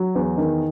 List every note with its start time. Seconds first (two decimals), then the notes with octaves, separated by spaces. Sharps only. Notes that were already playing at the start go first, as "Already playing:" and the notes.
Already playing: F#3
0.15 E2
0.38 D#3